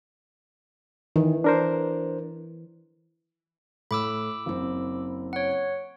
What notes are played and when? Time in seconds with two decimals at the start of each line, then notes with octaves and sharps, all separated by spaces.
1.16 D#3 E3
1.44 D4 A#4 C5
3.91 A2 B5 D6 E6
4.46 F#1 C4
5.33 C#5 F#5